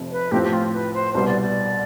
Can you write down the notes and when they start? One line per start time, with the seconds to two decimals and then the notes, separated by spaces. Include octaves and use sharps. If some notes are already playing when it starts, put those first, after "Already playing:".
Already playing: F1 F2 C3
0.12 B4
0.32 A2 F3 A3 C4 G4
0.42 G4
0.53 F4
0.73 B4
0.94 C5
1.14 C2 B2 G3 B3 C5
1.28 D5
1.41 D5